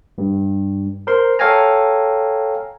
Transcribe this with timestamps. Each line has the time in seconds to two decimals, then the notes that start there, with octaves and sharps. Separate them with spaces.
0.18 G2
1.07 A#4 C5 C6
1.39 A4 C#5 F5 G5 G#5 A#5